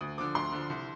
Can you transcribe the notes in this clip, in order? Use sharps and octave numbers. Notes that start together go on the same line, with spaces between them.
D2 D#6
D3 F3 D6
D2 C6
D3 F3
C2